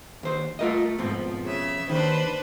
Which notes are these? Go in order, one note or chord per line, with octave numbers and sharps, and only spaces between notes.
D#2 C5
A3 F4 A#4 D#5
F2 G#2 B2 F3 C4
C#3 E5
D#2 D#3 D4 B4 C5